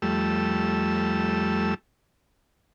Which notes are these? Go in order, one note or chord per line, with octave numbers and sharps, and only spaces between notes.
F2 G3 A3 E6